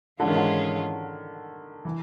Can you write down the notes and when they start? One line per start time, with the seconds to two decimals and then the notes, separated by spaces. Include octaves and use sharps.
0.20 G#2 D3 E3 G#3 C#4 F4
0.28 D#3
0.36 D3
1.85 E3